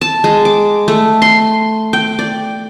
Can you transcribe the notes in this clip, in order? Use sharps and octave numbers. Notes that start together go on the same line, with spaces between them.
A5
G#3
D6
A3
C6
G5
D5